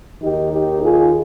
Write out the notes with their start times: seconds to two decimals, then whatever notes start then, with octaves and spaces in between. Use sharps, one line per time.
0.21 D#2 D#3 D#4 G4
0.51 D#4 G4
0.82 F4 G#4